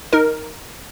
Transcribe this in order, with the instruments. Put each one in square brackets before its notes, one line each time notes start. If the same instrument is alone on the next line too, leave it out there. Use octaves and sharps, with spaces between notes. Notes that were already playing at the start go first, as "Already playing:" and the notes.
[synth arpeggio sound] D#4 A#4